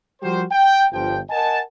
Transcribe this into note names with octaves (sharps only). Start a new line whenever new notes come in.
F3 G3 F#4 G4 A#4 C5
G5
G1 F3 G5
A#4 D#5 F#5 G#5 A5